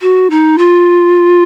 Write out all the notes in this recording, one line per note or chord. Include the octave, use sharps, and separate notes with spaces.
F#4
D#4
F4